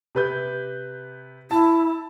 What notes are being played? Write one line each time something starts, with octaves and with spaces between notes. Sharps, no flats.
C3 B4 G6
E4 A5